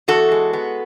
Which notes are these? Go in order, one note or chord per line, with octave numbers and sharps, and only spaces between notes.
E2 F#4 A4
G#3
B3